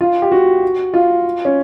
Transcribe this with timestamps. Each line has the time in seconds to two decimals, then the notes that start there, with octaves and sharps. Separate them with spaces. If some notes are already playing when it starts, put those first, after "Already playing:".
0.01 F4
0.22 G4
0.32 F#4
0.94 F4
1.45 C#4